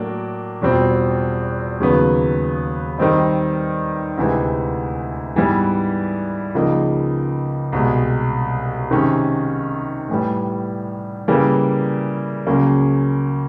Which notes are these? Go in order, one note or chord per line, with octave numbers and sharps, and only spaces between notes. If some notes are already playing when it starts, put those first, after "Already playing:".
Already playing: A2 F#3 A#3 D4
E2 B2 G3 C4 F4
D#2 C#3 F#3 B3
D#3 G3 C4 D#4
D2 C3 E3 G#3
G#2 E3 G3 B3
C#2 C#3 F3 A#3 D#4
C2 B2 G#3
C3 D#3 G#3 C#4
A2 E3 G3
C#3 E3 G3 A#3
C#2 C#3 F#3 A#3 C#4